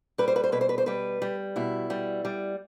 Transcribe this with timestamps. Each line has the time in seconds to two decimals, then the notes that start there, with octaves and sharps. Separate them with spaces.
0.18 G3 B4
0.28 C5
0.36 B4
0.44 C5
0.52 B2 B4
0.61 C5
0.69 B4
0.78 C5
0.86 G3 B4
1.22 G3
1.56 B2 E4
1.90 G3
2.25 G3